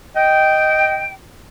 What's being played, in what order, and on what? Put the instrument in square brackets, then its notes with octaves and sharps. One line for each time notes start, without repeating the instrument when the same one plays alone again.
[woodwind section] D#5 G5